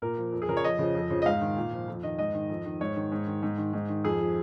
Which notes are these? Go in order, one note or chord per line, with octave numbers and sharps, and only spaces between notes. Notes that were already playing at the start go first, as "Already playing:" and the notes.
A#2 A#4
F3
F2
G#4
C#3 F3 A#4
C#5
F2 D#5
C#3 F3
F2
C#3 F3
D#5
G#2 F5
D#3
A#2
F3
F2
D#3 D#5
G#2 D#5
D#3
F2
D#3
G#2 C#5
D#3
G#2
D#3
G#2
D#3
G#2
D#3
F2 G#4
F3